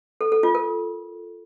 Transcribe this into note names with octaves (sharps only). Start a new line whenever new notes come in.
A4
A4
F4
A#4